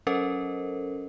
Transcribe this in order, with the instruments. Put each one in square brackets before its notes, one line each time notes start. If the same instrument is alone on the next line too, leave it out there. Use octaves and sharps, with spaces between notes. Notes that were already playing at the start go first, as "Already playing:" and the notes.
[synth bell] F#3 C#4 A4 A#4 C5 D#5